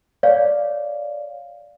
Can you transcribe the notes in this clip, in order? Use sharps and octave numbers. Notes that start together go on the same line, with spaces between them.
C#5 D5 F5